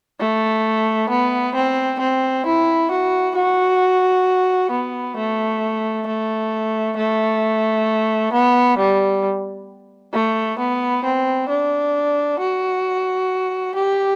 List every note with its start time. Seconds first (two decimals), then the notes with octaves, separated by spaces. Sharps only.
0.20 A3
1.09 B3
1.55 C4
1.99 C4
2.46 E4
2.90 F#4
3.35 F#4
4.71 B3
5.16 A3
6.07 A3
6.97 A3
8.33 B3
8.78 G3
10.13 A3
10.59 B3
11.04 C4
11.49 D4
12.39 F#4
13.75 G4